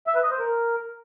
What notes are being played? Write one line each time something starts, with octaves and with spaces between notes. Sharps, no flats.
E5
B4
D#5
C5
A#4